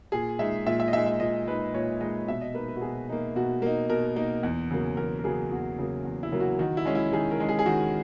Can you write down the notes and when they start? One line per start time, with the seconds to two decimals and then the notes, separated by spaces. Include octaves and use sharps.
0.12 A#2 G#4
0.39 G#3 D#4 E5
0.66 A#2 E5
0.80 E5
0.88 D#5
0.93 G#3 D#4 E5
1.06 E5
1.20 A#2 D#5
1.47 G#3 D#4 B4
1.74 A#2 C#5
2.01 G#3 D#4 D#5
2.28 B2 E5
2.41 D#5
2.54 A#3 D#4 B4
2.68 B4
2.76 F#4
2.81 B2 G#4
3.09 A#3 D#4
3.36 B2 F#4
3.62 A#3 D#4
3.90 B2 A#4
4.16 A#3 D#4
4.43 E2
4.71 C#3 F#3 A#3
4.97 E2 A#4
5.19 A#4
5.24 C#3 F#3 A#3 G#4
5.50 E2 F#4
5.79 C#3 F#3 A#3
6.05 E2
6.23 E4
6.31 C#3 F#3 A#3
6.40 F#4
6.59 D#3 F#4
6.77 E4
6.85 G#3 C#4
6.95 E4
7.13 D#3 G#4
7.31 A#4
7.40 G#3 C#4
7.49 G#4
7.59 G#4
7.66 D#3 F#4